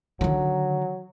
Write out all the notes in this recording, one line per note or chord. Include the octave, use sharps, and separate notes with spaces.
D3 D#3 F#3